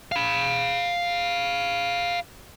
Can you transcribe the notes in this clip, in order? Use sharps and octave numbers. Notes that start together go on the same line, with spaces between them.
F5 B5